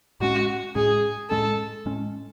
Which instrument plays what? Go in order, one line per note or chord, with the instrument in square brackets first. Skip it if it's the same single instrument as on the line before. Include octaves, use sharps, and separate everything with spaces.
[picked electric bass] A2 G#3 C#4 [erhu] F#4
[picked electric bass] A2 G#3 C#4 [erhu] G#4
[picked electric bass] A2 G#3 C#4 [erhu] A4
[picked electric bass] A2 G#3 C#4